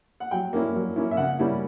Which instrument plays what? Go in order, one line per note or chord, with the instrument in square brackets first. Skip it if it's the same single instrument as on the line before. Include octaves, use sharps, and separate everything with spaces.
[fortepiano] F#5
F#3 G5
A#3 C#4 E4
F#3
A#3 C#4 E4
E5
C#3 F#5
G3 A#3 C#4 E4